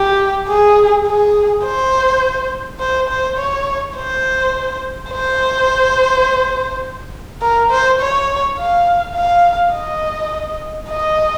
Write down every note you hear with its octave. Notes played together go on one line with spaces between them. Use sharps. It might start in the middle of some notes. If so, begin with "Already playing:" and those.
Already playing: G4
G#4
G#4
C5
C5
C5
C#5
C5
C5
A#4
C5
C#5
F5
F5
D#5
D#5